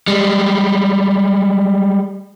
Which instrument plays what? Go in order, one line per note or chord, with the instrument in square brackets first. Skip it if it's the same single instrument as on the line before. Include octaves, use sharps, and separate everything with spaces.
[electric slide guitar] G3 G#3